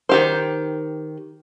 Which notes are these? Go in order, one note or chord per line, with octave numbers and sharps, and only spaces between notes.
D#3 G4 C5